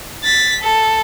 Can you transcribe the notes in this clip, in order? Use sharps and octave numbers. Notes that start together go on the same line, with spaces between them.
A6 B6
A4